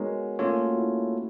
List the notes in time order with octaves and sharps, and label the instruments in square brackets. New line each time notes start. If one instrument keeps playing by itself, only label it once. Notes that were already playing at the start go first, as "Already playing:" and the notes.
Already playing: [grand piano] G#3 [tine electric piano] B3 D#4 F#4 A#4 C#5
[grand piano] A3 [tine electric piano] A#3 C#4 F4 A4 C#5
[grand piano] F#4
E4